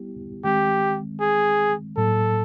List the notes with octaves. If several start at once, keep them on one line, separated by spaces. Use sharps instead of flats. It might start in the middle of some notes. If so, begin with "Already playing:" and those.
Already playing: G3 B3 E4 G4
D#3 G#3 C4 G4
G#4
A2 F#3 A#3 A4